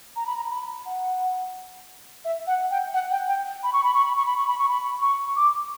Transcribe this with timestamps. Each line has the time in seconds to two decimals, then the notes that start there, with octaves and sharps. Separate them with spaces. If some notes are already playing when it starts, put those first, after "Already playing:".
0.16 A#5
0.27 B5
0.36 A#5
0.50 B5
0.86 F#5
2.25 E5
2.47 F#5
2.71 G5
2.94 F#5
3.11 G5
3.28 G5
3.63 B5
3.73 C#6
3.84 B5
3.94 C#6
4.05 B5
4.17 C#6
4.26 B5
4.37 C#6
4.47 B5
4.59 C#6
4.69 B5
5.02 C#6
5.36 D6